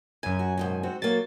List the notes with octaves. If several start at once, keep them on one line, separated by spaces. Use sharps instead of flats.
F#2 C#3 G#5
F#4
G#2 B2 D#3
G#2 C4 F#4
F#3 A#3 A6